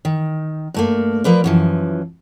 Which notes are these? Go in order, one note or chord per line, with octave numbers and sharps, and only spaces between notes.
D#3
G2 A3 A#3
F3 A#4 B4 D5
F#2 E3 F3